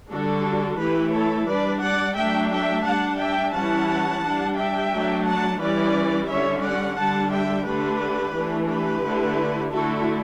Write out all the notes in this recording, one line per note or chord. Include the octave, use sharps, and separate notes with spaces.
D3 G3 D4 F#4 A4
E3 A3 E4 G4 B4
A4 C#5
G3 D4 B4 D5
D5 F#5
F#3 A3 D4 E5 G5
E5 G5
G3 D4 F#5 A5
E5 G5
E3 G3 C#4 E4 F#5 A5
G3 D4
E5 G5
F#3 A3 D4
F#5 A5
E3 G3 C#4 E4 B4 D5
D3 G3 C#4 C#5 E5
D5 F#5
D3 G3 D4 F#5 A5
E5 G5
D3 A3 D4 G4 B4
E3 A3 D4
G4 B4
D3 A3 E4
D3 A3 E4 F#4 A4